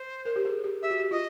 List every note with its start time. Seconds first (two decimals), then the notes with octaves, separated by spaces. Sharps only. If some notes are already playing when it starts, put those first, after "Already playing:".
Already playing: C5
0.25 A#4
0.36 G4
0.45 G#4
0.64 G4
0.82 G4 E5
0.91 F#4
1.00 G4
1.11 F4 D#5